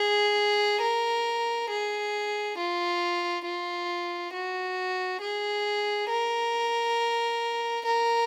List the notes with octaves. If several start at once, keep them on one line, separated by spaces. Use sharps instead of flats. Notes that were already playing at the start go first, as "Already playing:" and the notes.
Already playing: G#4
A#4
G#4
F4
F4
F#4
G#4
A#4
A#4